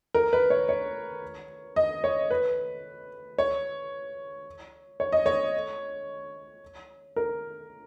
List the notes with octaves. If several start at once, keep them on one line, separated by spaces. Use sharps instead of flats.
A#4
B4
C#5
C#5
D#5
C#5
B4
C#5
C#5
D#5
C#5
A#4